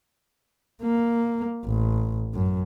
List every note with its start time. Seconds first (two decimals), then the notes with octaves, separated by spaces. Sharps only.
0.83 A#3
1.65 A1
2.34 F#2